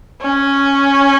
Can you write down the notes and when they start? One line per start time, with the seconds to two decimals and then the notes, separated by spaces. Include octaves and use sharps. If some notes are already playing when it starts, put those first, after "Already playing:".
0.21 C#4